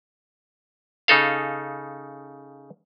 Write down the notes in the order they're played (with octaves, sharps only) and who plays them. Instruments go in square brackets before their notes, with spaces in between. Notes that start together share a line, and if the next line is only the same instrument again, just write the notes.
[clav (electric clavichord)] C#3 D#4 A4 F5